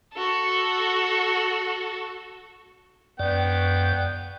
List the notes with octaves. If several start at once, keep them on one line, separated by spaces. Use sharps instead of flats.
F#4 A4
F#2 B3 D5 G5